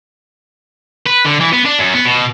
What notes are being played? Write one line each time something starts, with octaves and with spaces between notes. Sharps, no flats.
B4
D3
E3
B3
D4
F#2
B3
B2